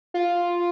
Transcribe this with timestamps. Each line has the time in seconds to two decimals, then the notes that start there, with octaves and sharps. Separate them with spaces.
0.14 F4